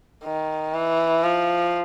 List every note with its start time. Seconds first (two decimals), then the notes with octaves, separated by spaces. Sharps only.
0.24 D#3
0.74 E3
1.23 F3